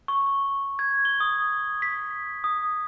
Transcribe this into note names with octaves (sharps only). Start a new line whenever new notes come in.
C#6
G#6
G7
D#6
B6
D#6